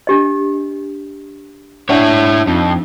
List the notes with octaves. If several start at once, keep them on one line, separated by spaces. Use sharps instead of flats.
D4 G4 D#5
D4 E4 C#5 D5 F#5
F2 D#4